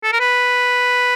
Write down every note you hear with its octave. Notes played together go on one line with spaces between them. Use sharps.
A4
A#4
B4